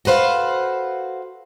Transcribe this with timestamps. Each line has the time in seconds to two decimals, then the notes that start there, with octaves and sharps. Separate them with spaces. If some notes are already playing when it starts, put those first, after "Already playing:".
0.05 F#4 A4 B4 C5 F5